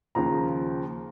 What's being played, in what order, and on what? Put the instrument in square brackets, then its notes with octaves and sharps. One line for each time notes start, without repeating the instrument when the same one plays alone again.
[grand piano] D#2 C#3 F3 A#5